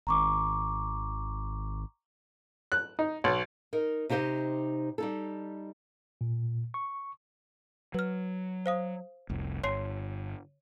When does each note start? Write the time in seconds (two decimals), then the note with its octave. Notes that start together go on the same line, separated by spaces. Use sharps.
0.07 G#1 A#5 C#6 D6
2.72 F#6
2.99 D#4
3.24 B1
3.73 D#4 A#4
4.09 C3 D#4 G4 C5 D#5
4.98 G3 D#4 A4
6.21 A#2
6.74 C#6
7.94 F#3 B4 F6
8.66 C5 F5 D#6
9.29 F1 C2
9.64 G1 C#5 C6 C7